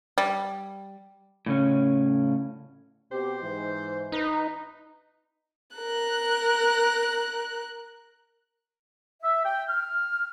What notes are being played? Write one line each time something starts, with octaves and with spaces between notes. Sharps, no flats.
G3
A2 C#3 C#4
B2 C4 G4 C5
G#2 E3
D#4 B4
A#4 F#6
E5
G5
F6